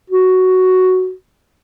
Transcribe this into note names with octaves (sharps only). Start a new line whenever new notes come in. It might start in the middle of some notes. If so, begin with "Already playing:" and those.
F#4